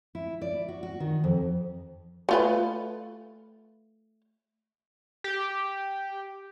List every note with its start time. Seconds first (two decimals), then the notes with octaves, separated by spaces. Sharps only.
0.15 E4
0.41 D5
0.68 F#4
0.83 F#4
1.00 D#3
1.24 F2
2.29 A3 F4 B4
5.24 G4